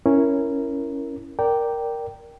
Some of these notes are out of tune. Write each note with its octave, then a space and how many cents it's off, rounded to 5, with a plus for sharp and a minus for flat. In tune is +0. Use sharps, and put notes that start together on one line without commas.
C#4 +0 E4 +0 A#4 +0
A#4 +0 D5 +0 G5 -5